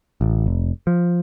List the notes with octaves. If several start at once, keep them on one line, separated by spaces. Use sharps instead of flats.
A1
F1
F3